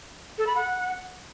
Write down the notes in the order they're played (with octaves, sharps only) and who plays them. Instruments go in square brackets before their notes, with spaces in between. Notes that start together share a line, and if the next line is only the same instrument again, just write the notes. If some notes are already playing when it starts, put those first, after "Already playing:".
[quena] A4
B5
F#5